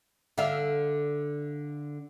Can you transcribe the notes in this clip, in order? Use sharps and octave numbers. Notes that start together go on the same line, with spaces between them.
D3 E5 F5